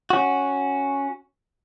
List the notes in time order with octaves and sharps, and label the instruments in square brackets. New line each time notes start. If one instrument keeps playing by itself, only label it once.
[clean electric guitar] C#4 F#4